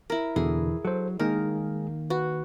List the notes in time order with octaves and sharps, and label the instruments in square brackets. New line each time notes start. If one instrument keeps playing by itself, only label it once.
[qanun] E4 A#4
[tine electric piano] E2 B2 D3 [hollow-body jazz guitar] E3 [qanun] G#4
[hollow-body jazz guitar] F#3 [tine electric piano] A4 C5
[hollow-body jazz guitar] D#3 A#3 [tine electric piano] G#3 D#4 G#4 [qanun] A#4
[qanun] F#4 [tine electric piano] B4